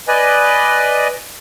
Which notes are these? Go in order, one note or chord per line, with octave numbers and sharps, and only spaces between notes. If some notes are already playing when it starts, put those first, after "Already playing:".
B4 D5 D#5 G#5